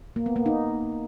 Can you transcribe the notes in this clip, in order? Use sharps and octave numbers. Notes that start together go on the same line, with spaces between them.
A#3
B3
A#3
D#4